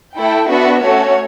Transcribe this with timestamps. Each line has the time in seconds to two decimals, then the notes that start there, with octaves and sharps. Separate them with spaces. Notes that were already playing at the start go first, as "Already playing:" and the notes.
0.17 A3 E4 A4 G5
0.50 B3 D4 F#4 E5
0.83 A3 C#4 F#4 A4 C#5